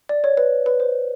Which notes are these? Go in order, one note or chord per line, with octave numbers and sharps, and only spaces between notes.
D5
C#5
B4
B4
C5